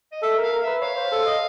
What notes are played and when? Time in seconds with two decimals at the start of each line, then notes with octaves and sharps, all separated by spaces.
0.12 D#5
0.22 A4 E5
0.38 A#4 F5
0.53 A#4
0.62 B4 E5
0.81 C#5 F5
0.97 C5
1.12 A4
1.26 D#5